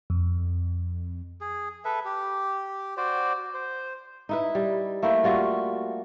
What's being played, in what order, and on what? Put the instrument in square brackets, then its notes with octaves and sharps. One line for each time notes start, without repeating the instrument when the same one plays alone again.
[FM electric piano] F2
[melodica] G#4
A4 B4 E5
G4
F#4 C5 D5
C5
[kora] D#4 E4 B4
G3
A3 A#3 E4 G5
G3 F4 F#4